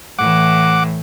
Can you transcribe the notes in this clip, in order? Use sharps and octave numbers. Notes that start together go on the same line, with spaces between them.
A2 E3 F#5 D6